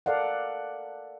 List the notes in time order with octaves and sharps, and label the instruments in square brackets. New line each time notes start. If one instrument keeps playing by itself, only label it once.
[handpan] A4 A#4 D5 F5 F#5